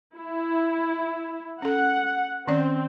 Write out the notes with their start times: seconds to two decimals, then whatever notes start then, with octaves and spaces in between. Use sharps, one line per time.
0.16 E4
1.62 C#4 A4 F#5
2.48 D#3 C4 C#4 D5